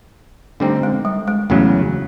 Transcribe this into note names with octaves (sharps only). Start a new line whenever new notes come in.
D3 G3 A3 C4 D#4
G#3
G3
G#3
E2 C#3 F#3 A3